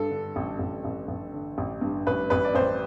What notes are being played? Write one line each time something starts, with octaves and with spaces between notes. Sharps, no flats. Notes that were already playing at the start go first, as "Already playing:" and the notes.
Already playing: G2 A4
D3
A1
A1
A1
A1
D3
A1
G2
A1 B4
A1 B4
D5
A1 C5